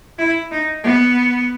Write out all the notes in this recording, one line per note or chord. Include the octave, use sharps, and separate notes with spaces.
E4
D#4
B3